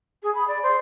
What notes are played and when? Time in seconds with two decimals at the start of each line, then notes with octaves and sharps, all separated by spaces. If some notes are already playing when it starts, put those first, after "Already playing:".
0.23 G#4
0.35 B5
0.48 D5
0.63 C5